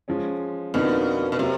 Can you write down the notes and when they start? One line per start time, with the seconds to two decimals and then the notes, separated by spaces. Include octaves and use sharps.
0.08 F3 G#3 C#4
0.74 F2 B2 D3 F3 A#3 D#4
1.32 B2
1.39 C3 F#3 A#3